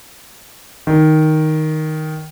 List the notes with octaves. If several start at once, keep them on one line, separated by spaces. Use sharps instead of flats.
D#3